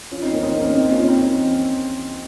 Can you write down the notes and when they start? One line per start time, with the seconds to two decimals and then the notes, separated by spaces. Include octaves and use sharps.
0.11 C#4 F4
0.22 C4 D#4
0.33 A#3 C#4
0.43 C4 D#4
0.60 A#3 C#4
0.76 C4 D#4
0.92 C#4 F4
1.08 C4 D#4